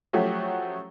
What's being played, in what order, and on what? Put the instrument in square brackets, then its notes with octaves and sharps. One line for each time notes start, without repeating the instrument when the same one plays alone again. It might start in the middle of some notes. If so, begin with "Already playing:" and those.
[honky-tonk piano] F3 F#3 A3 C#4 F#4 G4